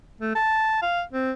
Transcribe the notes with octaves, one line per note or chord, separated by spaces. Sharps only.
A3
A5
F5
C4